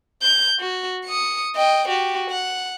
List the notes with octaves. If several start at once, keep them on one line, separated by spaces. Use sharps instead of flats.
G6
F#4
D#6 C#7
D#5 G5
F#4 G4
F#5